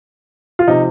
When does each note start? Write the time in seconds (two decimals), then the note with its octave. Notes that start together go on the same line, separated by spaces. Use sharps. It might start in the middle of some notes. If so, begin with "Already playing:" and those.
0.59 F4
0.68 C3 F3 D#4